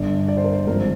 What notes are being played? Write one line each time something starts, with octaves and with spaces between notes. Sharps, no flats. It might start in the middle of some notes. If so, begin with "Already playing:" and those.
Already playing: G1 G2 D3 D5
D5
C5
A#4
C5
G#1 G2 D3 F3 A#4